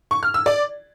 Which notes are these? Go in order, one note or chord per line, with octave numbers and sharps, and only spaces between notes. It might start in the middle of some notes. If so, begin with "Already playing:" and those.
C#6
F6
E6
D5